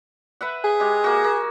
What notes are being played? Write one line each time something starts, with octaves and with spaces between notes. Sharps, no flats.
B4 E5 F#5
G#4
G#3 G4
A#3 F#4
A#3